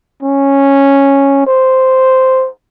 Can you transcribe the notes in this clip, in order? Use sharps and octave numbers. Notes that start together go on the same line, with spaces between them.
C#4
C5